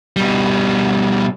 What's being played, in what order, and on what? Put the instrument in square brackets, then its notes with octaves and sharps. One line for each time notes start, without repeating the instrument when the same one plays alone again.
[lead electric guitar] B2 G3